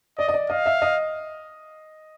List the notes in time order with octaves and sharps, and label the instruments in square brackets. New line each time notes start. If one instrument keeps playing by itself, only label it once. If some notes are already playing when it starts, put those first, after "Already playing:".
[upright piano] D5 [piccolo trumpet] D#5
[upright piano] D#5
D5
[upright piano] D#5 [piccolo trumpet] F5
[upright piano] E5
D#5